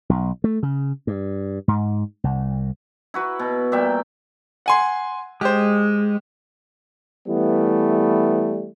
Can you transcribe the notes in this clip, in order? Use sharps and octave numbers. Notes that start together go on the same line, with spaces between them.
B1
A3
C#3
G2
G#2
C2
E4 F#4 B4
B2
A#2 G3 E5 G5
F#5 G#5 C6
G#3 G4 C5
E3 G3 A3 B3